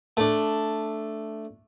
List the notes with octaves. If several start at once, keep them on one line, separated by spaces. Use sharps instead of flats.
A3 D4